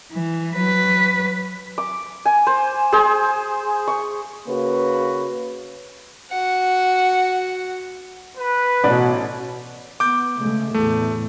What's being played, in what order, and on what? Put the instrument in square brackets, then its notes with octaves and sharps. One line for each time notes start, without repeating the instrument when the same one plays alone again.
[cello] E3
F#3 B4
[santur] D6
G#5
C5
G#4 C5
C#6
[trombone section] C#3 A#3 F#4 B4
[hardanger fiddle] F#4 F#5
[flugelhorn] B4
[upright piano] A1 D5 B5 [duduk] B2
[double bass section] B3 [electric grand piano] D6 G6
[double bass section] C#3 G#3 A3
[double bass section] E2 A2 [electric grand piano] A3